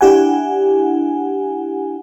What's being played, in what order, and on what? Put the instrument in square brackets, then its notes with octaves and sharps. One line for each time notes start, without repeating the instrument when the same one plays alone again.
[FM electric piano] D4 E4 G4 F#5 G#5